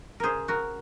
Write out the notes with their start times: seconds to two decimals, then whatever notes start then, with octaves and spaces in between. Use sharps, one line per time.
0.20 C#3 G#4 A#4 C5
0.48 C#3 F#4 A#4